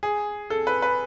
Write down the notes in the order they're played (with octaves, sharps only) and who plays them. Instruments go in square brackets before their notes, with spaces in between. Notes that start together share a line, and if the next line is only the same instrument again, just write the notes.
[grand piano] G#4
A4
B4
B4